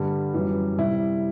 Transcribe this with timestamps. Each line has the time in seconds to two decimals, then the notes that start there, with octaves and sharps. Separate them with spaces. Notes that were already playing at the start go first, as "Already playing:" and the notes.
Already playing: G2 D3 G3
0.34 F#2 E3 G3
0.78 C3 G3 E4